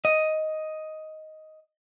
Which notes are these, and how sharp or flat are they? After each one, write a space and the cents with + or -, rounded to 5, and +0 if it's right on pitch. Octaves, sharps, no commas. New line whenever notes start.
D#5 +5